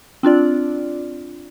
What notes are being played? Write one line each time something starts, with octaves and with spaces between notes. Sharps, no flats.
C4 D4 F4 D5